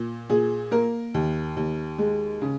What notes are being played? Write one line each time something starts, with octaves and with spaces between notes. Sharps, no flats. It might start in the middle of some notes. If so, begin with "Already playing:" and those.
Already playing: A#2
A#2 G#4
A#3 A#4
D#2
D#2
G#3
C#3